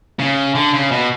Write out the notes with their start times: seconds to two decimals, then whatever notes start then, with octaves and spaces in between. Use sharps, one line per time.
0.19 C#3
0.55 D3
0.73 C#3
0.91 B2